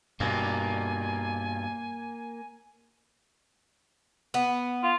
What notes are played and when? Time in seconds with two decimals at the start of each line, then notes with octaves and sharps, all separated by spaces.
0.20 G2 B2 A#3 G#5
4.34 B3
4.84 F4